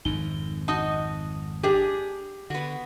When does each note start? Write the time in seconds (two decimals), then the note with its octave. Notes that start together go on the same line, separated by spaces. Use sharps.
0.05 G#1 F2 D#4 G7
0.68 D#4 F#4 D#5 A5 D#6
1.63 D4 G4 G#4
2.50 D3 B3 F#4